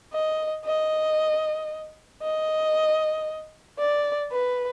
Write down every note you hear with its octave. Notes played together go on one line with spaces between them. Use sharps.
D#5
D#5
D#5
D5
B4